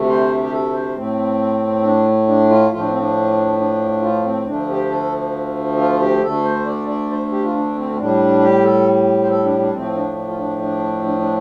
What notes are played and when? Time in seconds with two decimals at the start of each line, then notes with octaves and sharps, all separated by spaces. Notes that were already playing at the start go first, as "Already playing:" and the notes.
Already playing: D2 C3 A3
0.09 C5
0.42 G4
0.52 A4
0.73 C5
0.95 A2 A3 C4
1.83 D4
2.27 D4
2.49 F4
2.71 A2 F3 A3 F4
2.80 D4
2.89 C4
2.99 D4
3.59 D4
4.02 F4
4.24 C4
4.46 D2 D3 F3 A3 D4
4.69 G4
4.90 A4
5.78 F4
6.00 G4
6.22 D2 D3 A3 A4
6.44 C5
6.66 D5
6.88 D5
7.11 C5
7.32 G4
7.43 F4
7.53 D4
7.75 C4
7.93 C4
7.98 A2 G3 D4
8.41 G4
8.64 A4
9.22 C5
9.30 A4
9.44 D4
9.59 D4
9.73 A2 F3 A3 C4
9.96 D4
10.16 D4
10.28 F4
10.37 D4
10.61 D4
11.04 D4
11.19 D4